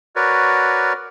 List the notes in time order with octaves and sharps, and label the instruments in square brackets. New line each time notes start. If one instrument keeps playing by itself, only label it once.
[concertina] F#4 A#4 B4 C#5 D5